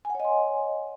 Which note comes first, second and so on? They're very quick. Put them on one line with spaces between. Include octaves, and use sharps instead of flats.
G#5 F#5 C#5 D#5 C6